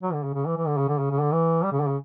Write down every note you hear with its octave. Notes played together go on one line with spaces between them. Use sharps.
F#3
D3
C#3
C#3
E3
E3
D3
C#3
D3
C#3
C#3
D3
E3
G3
C#3
D3
C#3